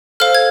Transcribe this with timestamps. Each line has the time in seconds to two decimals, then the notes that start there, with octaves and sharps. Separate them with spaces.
0.20 A4 C5 F5 F6
0.35 G#6